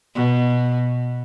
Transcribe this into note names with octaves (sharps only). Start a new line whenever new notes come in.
B2